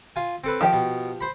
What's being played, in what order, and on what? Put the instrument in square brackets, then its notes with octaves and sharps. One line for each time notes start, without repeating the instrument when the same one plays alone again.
[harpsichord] F4 G#5
C4 A4 B4
[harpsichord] D#3 [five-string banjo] F3 G4 G5
[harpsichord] B2
C5 B5